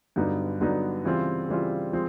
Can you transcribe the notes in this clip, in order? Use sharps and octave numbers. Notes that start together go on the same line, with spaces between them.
G2 D3 F#3 B3 D#4
G2 D3 F#3 B3 D#4
C#3 E3 G3 C4 F4
C#3 E3 G3 C4 F4
F3 G#3 C4